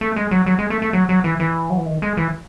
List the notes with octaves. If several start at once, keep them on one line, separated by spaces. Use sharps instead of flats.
A3
G#3
F#3
F#3
G#3
A3
A3
F#3
F#3
E3
E3
F#3
E3
D#3
G#3
E3